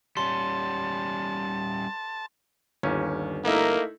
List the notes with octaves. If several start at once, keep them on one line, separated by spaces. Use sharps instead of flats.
G3 C#4 A5 C6
G1 D#2 C#4
A3 A#3 D#4 E4 A#4